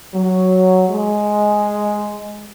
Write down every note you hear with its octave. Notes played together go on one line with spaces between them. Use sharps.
F#3
G#3